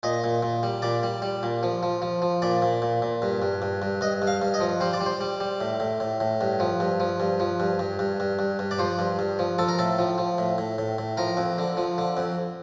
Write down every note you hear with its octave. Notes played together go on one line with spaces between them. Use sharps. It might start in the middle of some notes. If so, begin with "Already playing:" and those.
A#2 D#5
A#2
A#2
G3
A#2 D5
G3
G3
A#2
F3
F3
F3
F3
A#2 D5
A#2
A#2
A#2
G2
G2
G2
G2
G2 D#5
G2
F5
G2
D#5
F3
G3 C5
D5
G3
C5
G3
G3
A2
A2
A2
A2
G2
F3
G2
F3
G2
F3
G2
G2
G2
G2
G2
G2
D5
F3 C5
G2
G2
F3
F3 A4
A#4
A2 A4
F3
F3
A2
A2
A2
A2
F3 A#4
F2
D3
F3
D3
F2